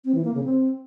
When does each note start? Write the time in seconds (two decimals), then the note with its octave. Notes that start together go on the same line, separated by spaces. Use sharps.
0.05 C4
0.14 E3
0.24 A#3
0.34 C#3
0.44 C4